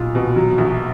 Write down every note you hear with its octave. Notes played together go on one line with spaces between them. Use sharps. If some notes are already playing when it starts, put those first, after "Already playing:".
Already playing: B1 A#2 F4
B2
F#3
A#1